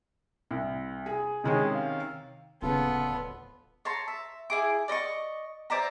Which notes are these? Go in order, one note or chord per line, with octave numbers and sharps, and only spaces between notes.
C2
G#4
C3 D#3 G#3 C#4
F5
D1 D#2 C#3 B3 F4 A4
C#5 A5 A#5 C6
E5
E4 G#4 D6
D5 D#5 C6 C#6
C5 D5 E5 A#5